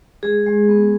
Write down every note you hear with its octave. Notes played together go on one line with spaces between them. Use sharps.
G#3 G#4
G#3
B3